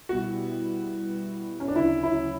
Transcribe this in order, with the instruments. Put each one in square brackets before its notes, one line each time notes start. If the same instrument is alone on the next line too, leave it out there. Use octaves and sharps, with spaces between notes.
[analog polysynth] B2 G3 B3 E4 [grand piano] F#4
[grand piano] C#4
D4
[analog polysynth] D2 C#3 F#3 C#4 [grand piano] E4
[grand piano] E4